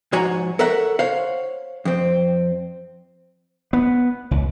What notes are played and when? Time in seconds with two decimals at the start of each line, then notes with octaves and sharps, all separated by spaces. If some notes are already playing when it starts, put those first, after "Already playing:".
0.13 G#2 F3 F#4 C#5 G#5 A#5
0.59 A4 A#4 C#5 E5 F#5
0.99 C5 C#5 F5 F#5
1.85 F2 C4
3.73 B3
4.31 C#2